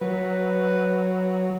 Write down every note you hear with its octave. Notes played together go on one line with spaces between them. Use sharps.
F#3 B4